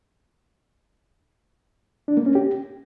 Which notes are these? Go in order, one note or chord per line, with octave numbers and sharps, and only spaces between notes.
D4
A#3
C#4
G4